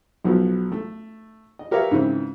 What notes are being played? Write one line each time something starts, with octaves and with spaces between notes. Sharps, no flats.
B1 F3 F#3 B3
A3
D#5
G4 A#4 B4 C#5 E5 F5
G#2 C#3 E3 C4